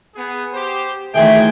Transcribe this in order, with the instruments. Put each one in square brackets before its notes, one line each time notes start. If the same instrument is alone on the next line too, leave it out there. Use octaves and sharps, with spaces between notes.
[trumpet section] B3 G#4
G4 C5
[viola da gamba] D#3 E3 A3 [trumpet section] F#4 C5 G5 [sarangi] G#4 [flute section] E5